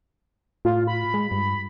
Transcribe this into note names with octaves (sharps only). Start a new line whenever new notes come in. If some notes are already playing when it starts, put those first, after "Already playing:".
A2 F4
B5
G#3
G2